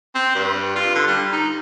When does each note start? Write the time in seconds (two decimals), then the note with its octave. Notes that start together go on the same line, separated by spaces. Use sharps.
0.15 C4
0.35 G2
0.76 F4
0.95 D3
1.07 G3
1.33 D#4